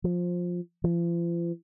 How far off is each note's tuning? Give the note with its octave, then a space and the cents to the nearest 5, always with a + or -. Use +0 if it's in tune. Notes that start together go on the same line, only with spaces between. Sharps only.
F3 +15
F3 -40